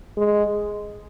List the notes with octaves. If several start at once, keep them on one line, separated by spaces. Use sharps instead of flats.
G#3